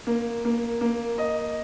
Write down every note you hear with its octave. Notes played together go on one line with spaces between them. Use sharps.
A#3
A#3
A#3
D#5